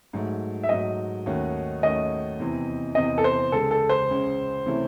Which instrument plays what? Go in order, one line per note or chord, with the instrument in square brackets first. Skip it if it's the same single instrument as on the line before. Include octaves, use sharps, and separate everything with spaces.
[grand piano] G#2 F#3 A3
[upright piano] E5
[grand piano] G#2 F#3 A3 [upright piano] D#5
[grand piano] D#2 D#3 A3 C#4 F#4
[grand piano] D#2 D#3 A3 C#4 F#4 [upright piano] D#5
[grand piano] E2 C3 E3 C4
[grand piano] E2 C3 E3 C4 [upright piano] D#5
[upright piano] A4
C5
[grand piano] C#2 C#3 G#3 [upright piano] A4
[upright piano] A4
C5
[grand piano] C#2 C#3 G#3
C3 E3 A3 C#4 E4